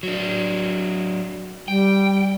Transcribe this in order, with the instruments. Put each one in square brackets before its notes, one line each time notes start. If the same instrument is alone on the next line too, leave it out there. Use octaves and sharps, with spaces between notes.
[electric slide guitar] F#3 D4
[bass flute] G3 [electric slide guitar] G5